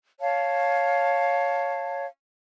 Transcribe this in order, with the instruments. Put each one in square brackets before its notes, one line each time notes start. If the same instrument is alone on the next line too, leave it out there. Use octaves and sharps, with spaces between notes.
[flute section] C#5 F5 A5